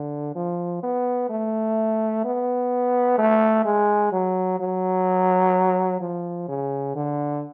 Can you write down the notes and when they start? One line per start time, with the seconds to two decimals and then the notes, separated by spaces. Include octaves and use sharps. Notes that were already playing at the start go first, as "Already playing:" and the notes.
Already playing: D3
0.35 F3
0.83 B3
1.29 A3
2.25 B3
3.18 A3
3.65 G#3
4.12 F#3
4.60 F#3
6.00 F3
6.48 C#3
6.95 D3